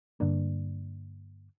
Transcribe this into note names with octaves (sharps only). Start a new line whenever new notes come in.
G2 D3 A#3 D4